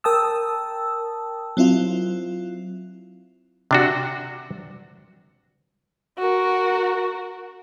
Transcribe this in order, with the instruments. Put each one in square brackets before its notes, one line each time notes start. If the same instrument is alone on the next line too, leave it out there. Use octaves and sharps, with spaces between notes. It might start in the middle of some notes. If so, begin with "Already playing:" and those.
[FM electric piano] A#4 G5 A5 D#6 E6
F#3 C4 E4 F4
[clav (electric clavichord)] C3 D4 F#4
[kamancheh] F#4 A#4